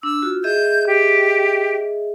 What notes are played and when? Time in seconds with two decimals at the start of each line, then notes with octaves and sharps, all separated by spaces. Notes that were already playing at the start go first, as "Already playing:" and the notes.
0.03 D4 E6
0.22 F4 F#4
0.44 G#4 D#5 E5 G6
0.87 G4